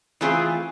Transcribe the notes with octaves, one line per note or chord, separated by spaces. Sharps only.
E3 A3 C4 F4 G#4